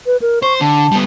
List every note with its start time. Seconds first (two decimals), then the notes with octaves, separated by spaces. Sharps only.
0.06 B4
0.22 A#4
0.43 C5 C#6
0.61 D3 A5
0.92 G3 B3